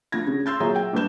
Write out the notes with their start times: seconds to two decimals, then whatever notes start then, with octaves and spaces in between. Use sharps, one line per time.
0.12 D2 F3 G#6 A#6
0.27 C#3
0.46 C6 E6 G6 A6
0.60 A#2 F#3 G#4 E5 A#5
0.76 G5
0.93 A#1 G2 B4 G6 E7